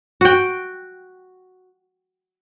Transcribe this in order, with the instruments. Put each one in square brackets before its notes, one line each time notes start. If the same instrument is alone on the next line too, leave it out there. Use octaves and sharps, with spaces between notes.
[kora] F#4 G5